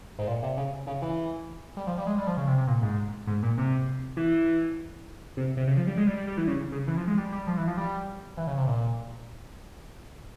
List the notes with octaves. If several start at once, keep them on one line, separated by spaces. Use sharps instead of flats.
G#2
A#2
C3
C#3
C#3
E3
G3
F3
G3
G#3
G3
F3
C#3
C3
C3
A#2
G#2
G#2
A#2
C3
E3
C3
C3
C#3
F3
G3
G#3
G3
G3
G3
E3
C#3
C#3
E3
F3
G#3
G3
G3
F3
E3
F3
G3
E3
C#3
C3
A#2